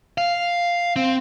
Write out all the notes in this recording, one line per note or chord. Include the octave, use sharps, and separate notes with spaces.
F5
C4